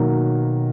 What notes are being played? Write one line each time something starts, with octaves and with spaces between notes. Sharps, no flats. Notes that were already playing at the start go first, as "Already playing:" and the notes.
Already playing: B2 D#3 F#3 A#3